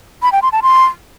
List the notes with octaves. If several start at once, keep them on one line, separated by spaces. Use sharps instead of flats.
B5
G5
C6
A5
C6